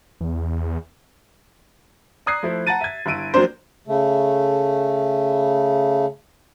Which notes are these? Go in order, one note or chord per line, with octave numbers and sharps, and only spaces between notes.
E2
D5 A#5 D#6 F#6 G#6 C7
F3 A3 E4
F#5 A5 A#5 A6 D#7
E5 G#6
G1 E4 E6 D7 D#7
F3 F#3 A#3 C4 D4 C5
C#3 A3